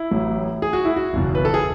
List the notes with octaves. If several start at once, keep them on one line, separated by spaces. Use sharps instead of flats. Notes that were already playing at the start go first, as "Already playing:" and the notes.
Already playing: E4
A1 A2 F#3
G#4
F#4
E4
F#4
F#1 E2 B2
B4
A4
G#4